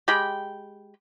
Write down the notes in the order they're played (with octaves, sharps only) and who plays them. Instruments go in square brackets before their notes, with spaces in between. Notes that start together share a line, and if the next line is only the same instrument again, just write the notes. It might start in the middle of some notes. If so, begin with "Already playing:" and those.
[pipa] G#3 G4 G5 B5